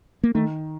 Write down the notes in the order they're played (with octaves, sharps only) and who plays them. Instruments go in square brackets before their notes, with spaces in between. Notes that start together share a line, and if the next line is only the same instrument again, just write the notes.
[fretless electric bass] A#3
[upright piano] D#3 [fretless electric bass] A3